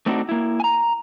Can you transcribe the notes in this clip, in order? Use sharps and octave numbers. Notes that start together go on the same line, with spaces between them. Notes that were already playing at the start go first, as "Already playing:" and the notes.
A3 C4 D4 D#4 F4 F#4
A#3 E4
G#5 A#5